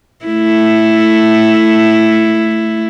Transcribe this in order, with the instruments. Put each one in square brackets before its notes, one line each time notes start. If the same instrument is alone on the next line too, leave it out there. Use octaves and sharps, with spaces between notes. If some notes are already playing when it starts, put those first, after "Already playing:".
[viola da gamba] A3 E4